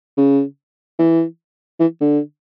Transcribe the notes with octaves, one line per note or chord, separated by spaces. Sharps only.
C#3
E3
E3
D3